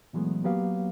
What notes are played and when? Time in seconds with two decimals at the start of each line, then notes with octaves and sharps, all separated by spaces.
0.13 A#2 E3 F#3 G#3 A3 B3
0.44 F#3 A#3 B3 G4 B4 F5